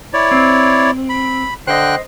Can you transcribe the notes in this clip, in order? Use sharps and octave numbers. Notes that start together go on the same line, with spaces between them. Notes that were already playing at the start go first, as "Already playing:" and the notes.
E4 C#5 D5
C4
B5
D3 C5 D#5 G5 F#6